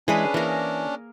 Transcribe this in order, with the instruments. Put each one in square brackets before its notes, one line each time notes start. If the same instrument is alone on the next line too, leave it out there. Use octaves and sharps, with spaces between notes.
[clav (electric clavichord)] E3 G#3 [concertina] C#4 D4 [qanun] G#4 B4 B5
[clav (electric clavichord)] E3 [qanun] A#3 A#4